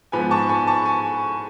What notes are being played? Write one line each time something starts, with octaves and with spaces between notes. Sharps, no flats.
G#2 F3 B3 G#5 B5
A5 C#6
G#5 B5
A5 C#6
G#5 B5